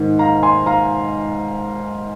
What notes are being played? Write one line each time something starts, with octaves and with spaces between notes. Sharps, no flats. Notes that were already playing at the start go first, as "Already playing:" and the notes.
Already playing: G#2 D#3
F5 A#5
G#5 C6
F5 A#5